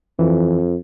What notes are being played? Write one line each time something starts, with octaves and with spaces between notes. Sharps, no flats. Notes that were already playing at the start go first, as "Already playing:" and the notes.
F2 E3